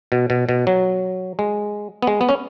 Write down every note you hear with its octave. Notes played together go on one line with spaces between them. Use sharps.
B2
B2
B2
F#3
G#3
B3
G#3
B3
C#4